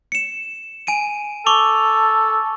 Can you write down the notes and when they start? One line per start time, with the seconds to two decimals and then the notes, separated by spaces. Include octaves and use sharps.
0.12 C#7 E7
0.87 G#5 D7 D#7
1.46 A4 C#6 D6 F7